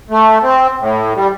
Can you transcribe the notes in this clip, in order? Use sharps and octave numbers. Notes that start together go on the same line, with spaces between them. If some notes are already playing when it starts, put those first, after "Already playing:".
A3
C4
A2
G3